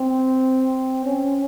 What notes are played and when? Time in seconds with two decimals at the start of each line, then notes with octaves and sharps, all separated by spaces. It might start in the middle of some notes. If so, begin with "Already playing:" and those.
Already playing: C4
1.05 C#4